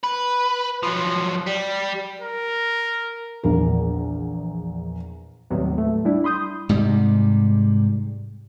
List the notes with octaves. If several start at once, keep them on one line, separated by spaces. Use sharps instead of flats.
B4
F3 F#3
G3
A#4
A#1 E2 A#4
D#2 A2 C3 F#3 G3 B3
A3
G3 D4 E4
B5 C6 D#6 G6
G#2 C3 G3